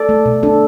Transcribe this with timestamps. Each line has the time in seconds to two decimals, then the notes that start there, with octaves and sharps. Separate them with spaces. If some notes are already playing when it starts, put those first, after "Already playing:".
Already playing: A4 D5
0.09 A3
0.26 B2
0.43 D4 A4